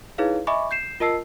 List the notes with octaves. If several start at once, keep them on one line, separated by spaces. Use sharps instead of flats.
D#4 E4 G#4 B4 C#5 F5
D#5 E5 G#5 B5 C#6 D6
G6 C7 E7
F4 A#4 D#5 A5 E6 C7